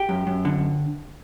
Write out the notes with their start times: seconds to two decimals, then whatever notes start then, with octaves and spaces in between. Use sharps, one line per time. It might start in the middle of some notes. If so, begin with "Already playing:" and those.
Already playing: G4
0.09 F#2
0.27 F#2
0.45 D3